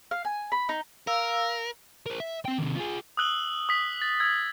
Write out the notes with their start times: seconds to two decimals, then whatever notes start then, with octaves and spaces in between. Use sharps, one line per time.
0.11 F5
0.25 G#5
0.52 B5
0.69 D#4
1.07 A#4 F5 E6
2.06 A#4 C5
2.20 E5
2.45 C4 G5
2.59 D#2 C3
2.76 F4 G#4
3.17 D#6 E6 F#6 F#7 G7
3.69 D#6 B6
4.02 A6
4.20 E6 G#6